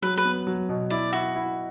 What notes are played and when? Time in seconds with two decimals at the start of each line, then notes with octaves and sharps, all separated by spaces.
0.02 F#3 B4
0.17 B4
0.25 B3
0.47 F#3
0.69 B2
0.90 E4 D5
1.13 E4 F#4
1.36 E4